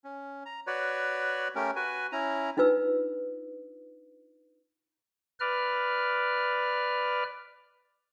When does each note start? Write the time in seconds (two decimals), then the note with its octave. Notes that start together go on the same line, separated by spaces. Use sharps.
0.04 C#4
0.46 A#5
0.67 F#4 B4 C#5 D5
1.55 A3 C#4 G4 A#4
1.76 F#4 B4 G#5
2.12 C#4 E4 A#5
2.57 D4 D#4 F4 B4 E6
5.40 B4 D5 F6